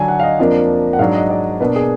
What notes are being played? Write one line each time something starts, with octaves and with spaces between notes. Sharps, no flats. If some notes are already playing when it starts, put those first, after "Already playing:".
Already playing: D3 F#3 D4 G#5
F#5
F5
D#5
F2 F3 A#3 D4
F#5
G#2 F#3 D4 F5
D#5
D5
B2 A#3 D4 B4
G#4